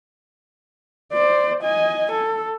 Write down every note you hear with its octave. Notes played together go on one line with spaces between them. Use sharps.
C5 D5
D#5 G#5
A4